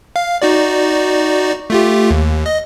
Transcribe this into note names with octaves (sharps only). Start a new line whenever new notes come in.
F5
D#4 F#4 D5
A3 F4 G4
D#2
D#5